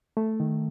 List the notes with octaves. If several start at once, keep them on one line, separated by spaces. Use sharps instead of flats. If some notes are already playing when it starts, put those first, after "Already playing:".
A3
D#3